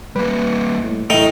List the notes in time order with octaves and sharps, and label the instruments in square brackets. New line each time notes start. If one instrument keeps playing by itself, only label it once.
[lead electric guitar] G3 A#3 [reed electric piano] B4
[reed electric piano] A2
[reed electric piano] A2 A3 [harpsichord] D#4 [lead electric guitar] D#5 G5